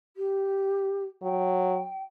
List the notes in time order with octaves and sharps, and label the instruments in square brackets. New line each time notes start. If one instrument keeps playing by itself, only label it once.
[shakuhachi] G4
[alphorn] F#3 [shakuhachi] G5